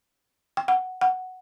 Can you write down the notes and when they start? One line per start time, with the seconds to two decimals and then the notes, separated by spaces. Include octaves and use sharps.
0.57 G5
0.68 F#5
1.01 F#5